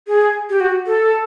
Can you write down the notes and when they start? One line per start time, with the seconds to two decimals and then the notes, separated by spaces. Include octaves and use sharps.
0.08 G#4
0.50 G4
0.60 F#4
0.87 A4